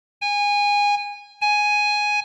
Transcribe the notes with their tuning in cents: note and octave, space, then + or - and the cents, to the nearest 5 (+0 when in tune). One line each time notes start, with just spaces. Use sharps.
G#5 -20
G#5 +5